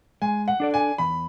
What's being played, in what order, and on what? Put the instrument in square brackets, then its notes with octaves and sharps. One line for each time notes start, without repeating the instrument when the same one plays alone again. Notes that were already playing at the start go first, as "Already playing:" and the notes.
[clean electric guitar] G#3 [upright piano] G#5
[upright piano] F#5
[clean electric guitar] D4 A4 D5
[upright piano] G#5
[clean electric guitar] E2 [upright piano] B5